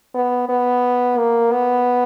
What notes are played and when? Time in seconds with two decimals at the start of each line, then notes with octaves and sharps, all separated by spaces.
0.15 B3
0.49 B3
1.18 A#3
1.52 B3